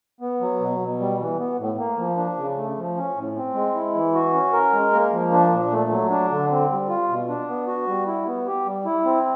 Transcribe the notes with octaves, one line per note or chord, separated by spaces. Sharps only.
B3
F#3
B2
B2
G3
E3
B3
A2
A#3
F3
D4
C#3
A3
F3
C#4
A2
C4
G#3
E4
E3
F#4
C#4
A#4
G#3
A#3
F3
D4
A#2
A3
F#3
D4
D3
C4
G3
F4
B2
D4
B3
F#4
G3
E4
B3
G4
G3
E4
C4